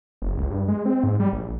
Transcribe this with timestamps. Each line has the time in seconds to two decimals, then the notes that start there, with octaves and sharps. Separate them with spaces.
0.22 F#1
0.38 C#2
0.51 G2
0.68 G#3
0.86 C4
1.04 G#2
1.20 G3
1.33 A#1